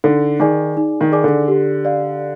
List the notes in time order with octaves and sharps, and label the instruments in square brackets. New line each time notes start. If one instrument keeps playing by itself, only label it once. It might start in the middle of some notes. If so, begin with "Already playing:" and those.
[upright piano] D3 [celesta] D#4
[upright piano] D#3 [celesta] G#4 D5 G#5 D6
[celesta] D#4
[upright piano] D#3
[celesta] G#4 D5 G#5 D6
[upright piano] D3
[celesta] G4
D5 F5